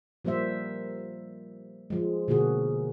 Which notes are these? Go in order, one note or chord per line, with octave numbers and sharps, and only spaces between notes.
F3 G3 A#3 C5 E5
F3 G#3
B2 D3 A#3 F#4 G#4